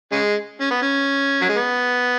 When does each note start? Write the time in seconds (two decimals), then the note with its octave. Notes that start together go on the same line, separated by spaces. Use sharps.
0.12 C#3 G#3
0.61 C#4
0.71 B3
0.82 C#4
1.42 F#3
1.49 G#3
1.57 B3